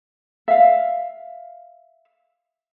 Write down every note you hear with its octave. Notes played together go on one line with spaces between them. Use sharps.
E5 F5